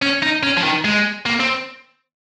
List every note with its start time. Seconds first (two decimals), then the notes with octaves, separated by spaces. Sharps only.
0.02 C#4
0.22 D#4
0.43 C#4
0.57 F3
0.64 D#3
0.85 G#3
1.26 A#3
1.40 C4